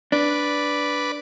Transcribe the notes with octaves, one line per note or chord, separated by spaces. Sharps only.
D4 B4 D5